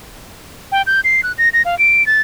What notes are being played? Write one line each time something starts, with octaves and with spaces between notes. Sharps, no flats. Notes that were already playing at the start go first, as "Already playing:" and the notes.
G5
G6
C7
F#6
A#6
A#6
F5
D7
A6